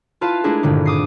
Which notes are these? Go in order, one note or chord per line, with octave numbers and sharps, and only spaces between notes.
E4 F4 B4 F5 A5
G#3 A3 D4 E4 G#4 A#4
G#1 G2 A#2 D3
D6 D#6 C7